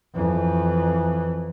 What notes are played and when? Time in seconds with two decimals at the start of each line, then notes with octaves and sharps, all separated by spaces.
0.15 F2 E3